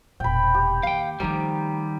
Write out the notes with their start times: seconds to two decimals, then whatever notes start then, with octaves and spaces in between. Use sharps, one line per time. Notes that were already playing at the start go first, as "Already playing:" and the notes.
0.20 E1 A#2 G5 B5
0.55 G4
0.83 D#3 A#3 F5 G5
1.20 D#3 F3 G3 A3 A#5 D6